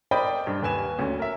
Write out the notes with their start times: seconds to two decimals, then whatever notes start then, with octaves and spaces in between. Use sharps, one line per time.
0.11 A#4 C5 D5 D#5 G5 B5
0.47 G2
0.62 D#2 B4 G#5 E7
0.99 D2 C#4
1.19 A#4 E5